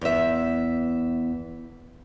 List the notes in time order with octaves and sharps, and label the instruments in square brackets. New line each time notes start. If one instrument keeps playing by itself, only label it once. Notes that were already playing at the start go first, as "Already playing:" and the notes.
[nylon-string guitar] E2 E5